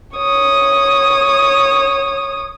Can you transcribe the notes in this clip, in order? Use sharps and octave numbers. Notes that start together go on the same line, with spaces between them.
C#5 D#6